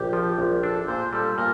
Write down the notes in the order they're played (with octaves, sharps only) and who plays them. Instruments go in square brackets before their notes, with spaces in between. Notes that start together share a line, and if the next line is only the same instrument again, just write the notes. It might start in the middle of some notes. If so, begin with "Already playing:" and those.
Already playing: [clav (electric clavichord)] A#1 [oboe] G4
[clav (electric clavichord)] F3
A#1
[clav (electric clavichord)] D4 [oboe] A4
[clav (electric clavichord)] A#2 [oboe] C5
[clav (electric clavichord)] G3 [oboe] A4
[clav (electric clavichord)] A#2 [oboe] A#4